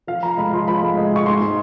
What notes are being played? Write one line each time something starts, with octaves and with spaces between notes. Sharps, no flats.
F3 F5
F3 A#5
G#3 B5
F3 C6
F3 B5
G#3
G#3
G#3 C#6
G#2 C6
G#3